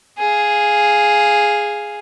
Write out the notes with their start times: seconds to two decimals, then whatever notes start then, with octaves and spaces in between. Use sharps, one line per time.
0.18 G#4 F5